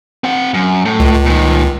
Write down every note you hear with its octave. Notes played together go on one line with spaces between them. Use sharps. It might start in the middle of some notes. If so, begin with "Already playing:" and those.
C4 F#5
F#2
A2
C#2
A#2 D#3